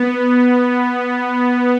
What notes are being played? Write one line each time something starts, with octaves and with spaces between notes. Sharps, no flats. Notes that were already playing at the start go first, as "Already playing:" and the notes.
Already playing: B3